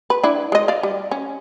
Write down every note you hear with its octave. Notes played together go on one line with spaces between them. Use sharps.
B4
D4 E4
G#3 D#5
D5 F5
G3
C#4